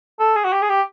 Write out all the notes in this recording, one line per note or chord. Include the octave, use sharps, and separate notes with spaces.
A4
G#4
F#4
G4
G#4
G4